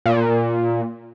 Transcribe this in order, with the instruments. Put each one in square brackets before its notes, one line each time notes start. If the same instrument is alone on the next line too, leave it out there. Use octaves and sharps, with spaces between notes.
[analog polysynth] A#2